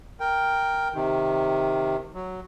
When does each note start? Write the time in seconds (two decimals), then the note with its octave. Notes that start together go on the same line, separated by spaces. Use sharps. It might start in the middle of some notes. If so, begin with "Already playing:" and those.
0.20 A#4 G5
0.94 C3 D#3
2.14 F#3